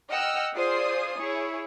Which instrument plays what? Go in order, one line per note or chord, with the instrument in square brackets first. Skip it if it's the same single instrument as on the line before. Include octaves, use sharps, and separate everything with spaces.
[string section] D#5 F#5 G5 E6 F6
F4 G#4 C5 D5 D#6 C7
E4 G#4 C#5